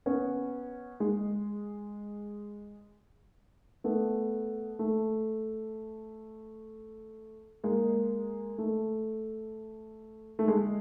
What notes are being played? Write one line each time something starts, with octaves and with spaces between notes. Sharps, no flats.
B3 C#4
G#3
A3 B3
A3
G#3 A#3
A3
A3
G#3